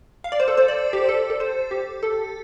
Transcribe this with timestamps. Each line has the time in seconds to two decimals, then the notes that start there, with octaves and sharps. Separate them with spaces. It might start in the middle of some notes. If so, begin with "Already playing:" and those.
0.24 F5
0.32 D5
0.40 C5
0.48 A4
0.57 C5
0.68 D5
0.93 G4
1.09 A4
1.30 A4
1.40 C5
1.71 G4
2.03 A4